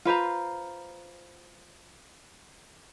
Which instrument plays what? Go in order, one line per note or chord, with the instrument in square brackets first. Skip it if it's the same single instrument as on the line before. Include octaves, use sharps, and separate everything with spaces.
[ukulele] F4 B4 C5 A#5